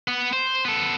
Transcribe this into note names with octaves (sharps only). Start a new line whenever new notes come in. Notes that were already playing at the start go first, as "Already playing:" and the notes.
B3
C5
B3 A4